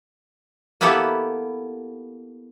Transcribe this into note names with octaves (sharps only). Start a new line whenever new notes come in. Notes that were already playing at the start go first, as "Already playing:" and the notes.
A#3 B3 E4 G4 A4 F#5